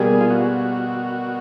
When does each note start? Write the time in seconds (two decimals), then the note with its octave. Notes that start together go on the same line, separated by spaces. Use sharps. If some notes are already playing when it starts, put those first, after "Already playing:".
Already playing: B2 G3 A#3 G#4
0.21 F4
0.30 F#4